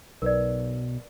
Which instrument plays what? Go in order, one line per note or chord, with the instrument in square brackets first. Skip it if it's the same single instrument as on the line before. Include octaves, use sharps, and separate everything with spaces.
[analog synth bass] B1 [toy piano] A#4 B4 D5